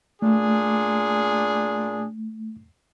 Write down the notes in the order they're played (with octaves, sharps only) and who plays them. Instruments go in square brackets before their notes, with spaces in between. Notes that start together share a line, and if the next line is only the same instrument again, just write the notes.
[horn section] A#2 D4 G#4 [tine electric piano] A3